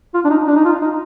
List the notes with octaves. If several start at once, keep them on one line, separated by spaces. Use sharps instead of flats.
F4
D4
D#4
D4
D#4
F4
D#4